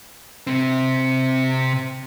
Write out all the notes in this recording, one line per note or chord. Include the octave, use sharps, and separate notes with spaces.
C3 C4